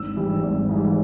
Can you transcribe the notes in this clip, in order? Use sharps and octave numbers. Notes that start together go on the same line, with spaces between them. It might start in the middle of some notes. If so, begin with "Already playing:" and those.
Already playing: G#1 E6
G#2 E3 G3
G#1
G#2 E3 G3